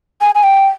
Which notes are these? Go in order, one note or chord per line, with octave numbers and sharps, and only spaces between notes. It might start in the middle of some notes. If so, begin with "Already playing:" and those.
G#5
G#5
G5